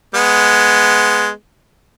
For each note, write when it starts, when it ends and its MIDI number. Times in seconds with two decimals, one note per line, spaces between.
0.14 1.30 56
0.14 1.30 59